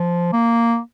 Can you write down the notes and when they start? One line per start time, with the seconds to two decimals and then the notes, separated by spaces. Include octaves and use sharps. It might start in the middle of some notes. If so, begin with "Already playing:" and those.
Already playing: F3
0.33 A#3